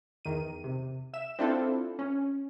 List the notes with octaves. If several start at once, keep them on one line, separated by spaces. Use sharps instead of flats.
E2 D#3 D#7
C3
E5 E7
C4 D4 E4 F4 A4 C5
C#4